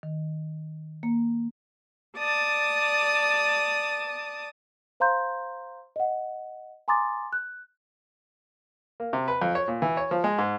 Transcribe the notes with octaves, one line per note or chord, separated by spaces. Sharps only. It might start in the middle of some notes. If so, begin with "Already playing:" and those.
D#3
A#3
D5 A5 D#6
C5 F5 A#5 C6 G6
D#5 F#5
G#5 A#5 C6 D6 D#6 A6
F#6
A#3
C3
B4
F2
C#5
A#2
E3
C#5
F3
G#3
G#2